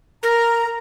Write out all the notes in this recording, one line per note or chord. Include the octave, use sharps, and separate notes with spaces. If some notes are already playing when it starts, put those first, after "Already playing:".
A#4 A#5